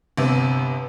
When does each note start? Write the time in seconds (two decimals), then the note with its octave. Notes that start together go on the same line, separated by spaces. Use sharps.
0.17 G1 C3 B3